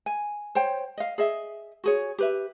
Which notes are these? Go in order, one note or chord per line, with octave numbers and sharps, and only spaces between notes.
G#5
C5 C#5 G5
D#5 F5
G#4 D#5 E5
F#4 G#4 C#5
G4 B4 E5